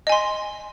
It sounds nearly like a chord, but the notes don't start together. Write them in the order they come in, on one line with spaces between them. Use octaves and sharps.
D#5 G#5 C6